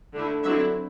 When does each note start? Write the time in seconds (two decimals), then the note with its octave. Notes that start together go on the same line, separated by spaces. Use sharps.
0.14 D3 A3 E4
0.44 D3 F#3 C4 E4 E5